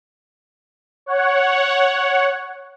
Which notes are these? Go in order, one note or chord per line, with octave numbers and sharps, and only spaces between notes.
C#5 F#5